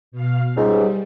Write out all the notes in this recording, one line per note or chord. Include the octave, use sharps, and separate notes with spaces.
B2 F5
C#2 G#2 G3